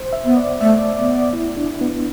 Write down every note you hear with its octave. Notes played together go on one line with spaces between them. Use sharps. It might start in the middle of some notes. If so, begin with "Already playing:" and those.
Already playing: C5
E5
B3
D5
A3 E5
D5
B3 D5
D5
E4
D4
B3